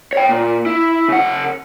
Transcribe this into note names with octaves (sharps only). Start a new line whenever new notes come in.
C#5 G5
A#2
E4
C#3 F#5